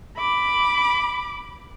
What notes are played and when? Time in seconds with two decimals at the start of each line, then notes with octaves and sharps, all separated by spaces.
0.17 B5 D6